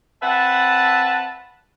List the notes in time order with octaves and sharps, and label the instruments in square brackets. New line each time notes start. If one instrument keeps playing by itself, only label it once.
[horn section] C4 B4 E5 F#5 A5